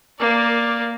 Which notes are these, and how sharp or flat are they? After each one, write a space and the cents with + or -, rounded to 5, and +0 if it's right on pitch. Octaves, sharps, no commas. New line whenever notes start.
A#3 +0 D5 +0